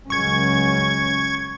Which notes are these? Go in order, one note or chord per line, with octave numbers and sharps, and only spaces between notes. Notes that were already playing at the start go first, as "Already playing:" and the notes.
C#2 F#3 C#4 C#6 G#6